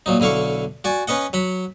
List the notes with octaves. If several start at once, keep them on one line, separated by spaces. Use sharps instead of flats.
A#2 F#3 D#4
B1 D3 E4 F5 C#6
F#4 D5 G#5
C#4 B4 D#5 F#5
F#3 F#5 B5